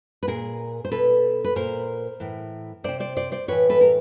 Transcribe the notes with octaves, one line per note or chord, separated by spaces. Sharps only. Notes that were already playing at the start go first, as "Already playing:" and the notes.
B4
A#2 G#4 A#4
C5
B2 A4 B4
B4
A#2 A#4 C5
A2 E3
C3 D#3 C5 D5
C5 D5
C5 D5
C5 D5
A2 E3 B4 C#5
A4 B4
A#4